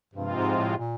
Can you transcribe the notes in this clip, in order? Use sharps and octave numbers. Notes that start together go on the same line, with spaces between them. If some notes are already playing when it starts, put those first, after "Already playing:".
G2 C3 F3 G#3 C4 F4
G#2
A2
A#2